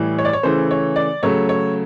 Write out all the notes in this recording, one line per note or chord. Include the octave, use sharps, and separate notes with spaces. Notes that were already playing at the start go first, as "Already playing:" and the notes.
Already playing: A2 E3 G3
C#5
D5
C#5
C#3 E3 A3 C5
C#5
D5
C#3 F#3 A3 C#5
C#5